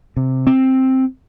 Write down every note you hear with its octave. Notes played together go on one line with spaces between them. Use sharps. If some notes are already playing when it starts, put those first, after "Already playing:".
C3
C4